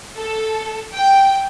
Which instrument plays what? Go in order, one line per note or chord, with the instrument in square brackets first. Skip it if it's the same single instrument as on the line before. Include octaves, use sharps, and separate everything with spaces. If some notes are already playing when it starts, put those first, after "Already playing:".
[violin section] A4
G5